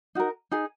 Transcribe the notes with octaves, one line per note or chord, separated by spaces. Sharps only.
D#4 F#4 A#4
D#4 G#4